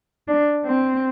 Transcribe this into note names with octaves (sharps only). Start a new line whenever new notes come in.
D4
C4